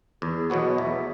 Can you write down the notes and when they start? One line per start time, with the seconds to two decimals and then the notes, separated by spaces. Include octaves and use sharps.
0.22 E2 G#4
0.50 B2 F#3 B3 F#4
0.59 C#5
0.69 D#5
0.78 E2 E5